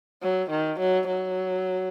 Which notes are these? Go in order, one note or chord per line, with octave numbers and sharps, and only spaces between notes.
F#3
D#3
F#3
F#3